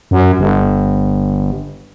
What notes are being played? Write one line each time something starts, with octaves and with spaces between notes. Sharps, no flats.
F#2
G1